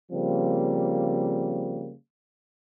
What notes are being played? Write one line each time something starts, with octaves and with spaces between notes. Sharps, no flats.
C#3 F3 G3 A#3 C4